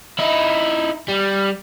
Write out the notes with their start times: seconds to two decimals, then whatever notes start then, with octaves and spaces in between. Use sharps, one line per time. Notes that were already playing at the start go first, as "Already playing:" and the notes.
0.19 D#4 E4
1.08 G3